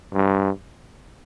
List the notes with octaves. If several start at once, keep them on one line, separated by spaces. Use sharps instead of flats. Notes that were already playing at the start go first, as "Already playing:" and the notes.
G2